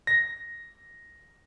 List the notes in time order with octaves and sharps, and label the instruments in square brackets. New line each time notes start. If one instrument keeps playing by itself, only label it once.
[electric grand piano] A#6